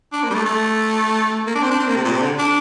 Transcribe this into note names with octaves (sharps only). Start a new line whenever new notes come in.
D4
A#3
G3
A3
A3
A#3
D4
C4
D4
C4
A#3
C3
A#2
C3
D3
D4